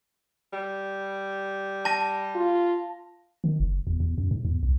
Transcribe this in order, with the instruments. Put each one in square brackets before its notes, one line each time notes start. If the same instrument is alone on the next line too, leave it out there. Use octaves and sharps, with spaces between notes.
[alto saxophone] G3
[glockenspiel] A5 A#6
[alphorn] F4
[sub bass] D#3
F#1
E2
E2
F#2
G#2
E2
C2